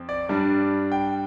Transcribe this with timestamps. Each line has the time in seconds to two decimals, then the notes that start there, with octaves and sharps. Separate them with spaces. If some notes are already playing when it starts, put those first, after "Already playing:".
Already playing: F2 C4
0.09 D5
0.29 G2 G3 D4
0.92 G5